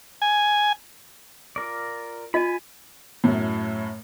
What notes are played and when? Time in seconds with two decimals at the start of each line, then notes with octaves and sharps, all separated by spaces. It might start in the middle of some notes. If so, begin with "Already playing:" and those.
0.22 G#5
1.56 F4 A#4 D5
2.34 F4 D#5 G#5 B5
3.24 F#2 A2